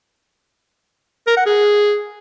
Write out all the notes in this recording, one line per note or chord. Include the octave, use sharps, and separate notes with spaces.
A#4
F#5
G#4